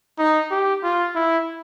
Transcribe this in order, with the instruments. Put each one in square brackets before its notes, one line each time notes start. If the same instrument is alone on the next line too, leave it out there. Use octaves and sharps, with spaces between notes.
[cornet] D#4
G4
F4
E4